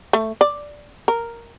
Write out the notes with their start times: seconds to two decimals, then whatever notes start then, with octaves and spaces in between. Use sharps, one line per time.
0.13 A3
0.41 D5
1.08 A#4